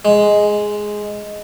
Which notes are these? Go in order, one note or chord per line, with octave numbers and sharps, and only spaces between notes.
G#3